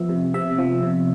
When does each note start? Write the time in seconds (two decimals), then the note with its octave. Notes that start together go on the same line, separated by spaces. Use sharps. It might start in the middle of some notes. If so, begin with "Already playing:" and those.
Already playing: F3 B3 E5
0.09 C3
0.34 C3 E5
0.58 F3
0.83 C3